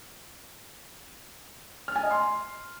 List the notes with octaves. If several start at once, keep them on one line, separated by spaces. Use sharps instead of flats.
F6
G#5
D#5
C6